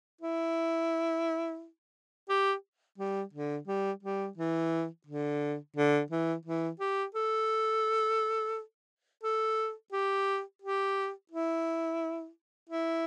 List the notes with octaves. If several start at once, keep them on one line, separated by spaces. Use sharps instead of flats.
E4
G4
G3
D3
G3
G3
E3
D3
D3
E3
E3
G4
A4
A4
G4
G4
E4
E4